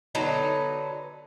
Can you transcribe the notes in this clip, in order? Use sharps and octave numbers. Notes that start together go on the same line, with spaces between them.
D3 F#3 B3 D#4